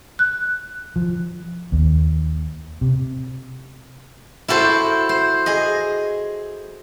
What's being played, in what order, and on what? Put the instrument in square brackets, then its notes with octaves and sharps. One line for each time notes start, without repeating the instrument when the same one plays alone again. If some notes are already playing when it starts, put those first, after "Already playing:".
[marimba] F#6
[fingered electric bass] F3
D#2
C3
[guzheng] E4 F#4 A4 C5
C5
G#4 D#5